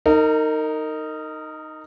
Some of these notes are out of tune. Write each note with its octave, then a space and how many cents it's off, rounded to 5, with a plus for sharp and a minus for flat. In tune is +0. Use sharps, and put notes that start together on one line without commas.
D#4 +0 A#4 -30